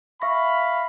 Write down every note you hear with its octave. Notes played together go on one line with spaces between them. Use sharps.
E5 F5 B5 C#6 A#6